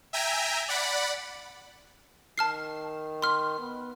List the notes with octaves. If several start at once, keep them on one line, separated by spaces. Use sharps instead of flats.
E5 G5 G#5 A#5
D5 F#5 B5
D#3 A5 F6 C7
C6 F6
B3